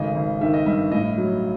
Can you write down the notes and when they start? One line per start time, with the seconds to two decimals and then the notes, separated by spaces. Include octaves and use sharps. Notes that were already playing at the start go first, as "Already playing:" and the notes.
Already playing: G#1 C#3 A3 D#5
0.15 G#1
0.41 D#3 E5
0.54 D#5
0.66 G2 E5
0.92 A2 D#5
1.18 F#3